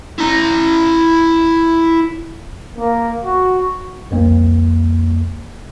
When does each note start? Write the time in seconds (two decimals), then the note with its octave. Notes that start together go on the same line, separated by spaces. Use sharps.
0.18 E4 A#5
2.78 A#3
3.25 F#4
4.11 C2 F2 A#3